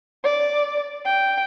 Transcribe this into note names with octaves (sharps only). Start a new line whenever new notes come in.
D5
G5